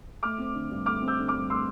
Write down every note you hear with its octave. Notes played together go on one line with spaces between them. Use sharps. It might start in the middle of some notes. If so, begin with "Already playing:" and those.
A3 D6 F6
C4
D3
G2
A3 D6 F6
C4
E6 G6
D3
D6 F6
G2
A3 C6 E6